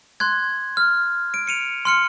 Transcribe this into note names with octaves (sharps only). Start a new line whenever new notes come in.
C6 F#6 G#6
F6
D7
C#7 D#7 F7
C6 F6 C#7